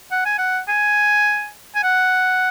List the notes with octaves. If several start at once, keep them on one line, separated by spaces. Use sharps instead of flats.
F#5
G#5
F#5
G#5
G#5
F#5